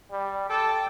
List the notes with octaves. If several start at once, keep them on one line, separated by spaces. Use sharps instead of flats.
G3
A4 G5 A5 D6